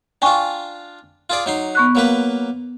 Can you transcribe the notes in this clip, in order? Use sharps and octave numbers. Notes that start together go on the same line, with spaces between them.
D4 F4 G5 G#5 C#6
F4 G#4 D5
F#3 D#4 C6
B3 C#6 F#6
F#3 A#3 B4